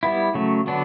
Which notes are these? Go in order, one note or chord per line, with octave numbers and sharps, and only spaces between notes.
G3 B3 E4
C#3 F#3 A3
D3 F#3 B3 D4